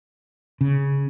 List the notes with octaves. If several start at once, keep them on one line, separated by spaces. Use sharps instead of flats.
C#3